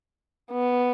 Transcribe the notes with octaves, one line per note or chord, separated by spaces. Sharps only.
B3